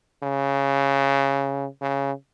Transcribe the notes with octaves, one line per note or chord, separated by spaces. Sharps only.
C#3
C#3